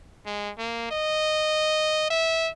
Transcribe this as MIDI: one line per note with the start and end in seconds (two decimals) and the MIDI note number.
0.26 0.51 56
0.58 0.87 58
0.91 2.07 75
2.10 2.50 76